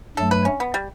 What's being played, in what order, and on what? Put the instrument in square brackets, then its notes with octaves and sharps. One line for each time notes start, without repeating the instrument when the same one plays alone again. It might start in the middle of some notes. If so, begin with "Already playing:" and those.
[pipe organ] G2 F#3 A3 [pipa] A4
[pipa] B4
C#4
B3
G3